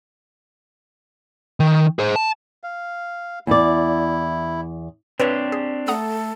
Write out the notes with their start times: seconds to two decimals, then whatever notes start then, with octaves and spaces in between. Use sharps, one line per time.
1.60 D#3
1.99 G#4 C5
2.16 A5
2.64 F5
3.47 E2 E4 D5
5.20 C4 D4 G4 B4 C#5
5.52 G#4
5.88 A3 A4 F#5 A#5 D#6